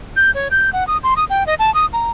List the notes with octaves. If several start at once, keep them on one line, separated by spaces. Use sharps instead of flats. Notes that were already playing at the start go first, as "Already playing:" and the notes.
G6
C#5
G6
F#5
D#6
C6
D#6
G5
D#5
A5
D#6
A#5